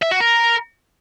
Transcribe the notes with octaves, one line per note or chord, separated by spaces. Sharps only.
E5
F#4
A#4